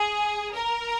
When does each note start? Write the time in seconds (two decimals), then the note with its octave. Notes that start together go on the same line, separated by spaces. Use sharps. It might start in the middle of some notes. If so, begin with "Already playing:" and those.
Already playing: G#4
0.54 A#4